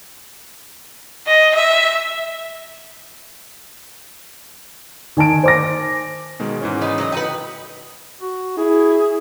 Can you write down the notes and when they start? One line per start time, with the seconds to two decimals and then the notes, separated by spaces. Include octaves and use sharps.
1.27 D#5
1.55 E5
5.17 D#3 G#5 A5 D7
5.43 C5 D6 A#6
6.40 B2 D#3 G#3
6.61 G#2 E3 C#4
6.81 D#4 B4 D5
6.98 F#3 D5 D#5
7.12 D#4 F#4 B4 G5
8.21 F#4
8.58 E4 G#4